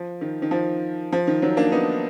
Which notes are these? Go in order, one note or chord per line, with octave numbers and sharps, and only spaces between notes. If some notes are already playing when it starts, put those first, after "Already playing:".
Already playing: F3
D#3
D#3
F3
F3
D#3
D#3 F#3
A#3 D4
B3 D#4